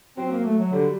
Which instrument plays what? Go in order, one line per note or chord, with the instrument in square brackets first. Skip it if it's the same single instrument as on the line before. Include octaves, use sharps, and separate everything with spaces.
[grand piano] F#3 [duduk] C4
[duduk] A#3
A3
F#3
[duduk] D3 [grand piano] G3